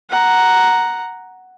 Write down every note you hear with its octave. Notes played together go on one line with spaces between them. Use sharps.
F#5 A#5